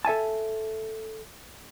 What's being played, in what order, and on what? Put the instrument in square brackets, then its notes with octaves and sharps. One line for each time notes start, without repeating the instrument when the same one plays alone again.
[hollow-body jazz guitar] A4 E5 G#5 A5